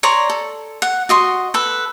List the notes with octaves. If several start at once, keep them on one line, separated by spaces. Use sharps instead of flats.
C#5 D5 A#5 C6
A4
F#5
F#4 D#5 C6
A4 B4